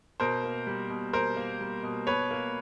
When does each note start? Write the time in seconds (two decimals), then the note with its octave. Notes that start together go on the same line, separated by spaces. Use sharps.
0.20 B2 A#4 C5
0.44 A#3
0.67 G3
0.90 B2
1.13 B2 A#4 C5
1.37 A#3
1.61 G3
1.83 B2
2.07 B2 B4 C#5
2.31 A#3